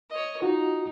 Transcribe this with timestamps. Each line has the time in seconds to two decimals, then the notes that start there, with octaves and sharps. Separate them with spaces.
0.10 C#5 D#5
0.42 D#4 F4 F#4